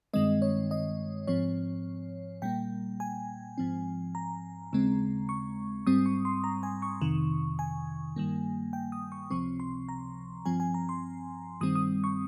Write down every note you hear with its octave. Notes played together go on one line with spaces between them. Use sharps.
G2 D#3 G#3 C4 D#5
C#5
D#5
G#2 F3 C4 C#5
A#2 G3 A#3 G5
G#5
G#2 F3 C4
A#5
D#2 C#3 G#3 C4
C#6
G#2 G3 C4 D#6
C#6
C6
A#5
G#5
C#6
F2 C3 D#3
G#5
G2 D#3 G3 A#3
G5
D#6
C#6
C#2 C3 F3 C4 C#6
C6
A#5
G2 F3 C4 G#5
G#5
A#5
C6
G2 D#3 G3 C4 D#6
D#6
C#6